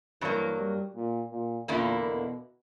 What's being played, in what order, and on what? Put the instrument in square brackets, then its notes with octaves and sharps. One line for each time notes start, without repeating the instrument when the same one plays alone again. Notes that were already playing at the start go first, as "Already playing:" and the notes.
[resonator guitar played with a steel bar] G2 F#3 A#3 [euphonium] E3
[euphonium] G3
A#2
A#2
[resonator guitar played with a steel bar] E2 D3 A#3 E4 [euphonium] A#2
[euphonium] B2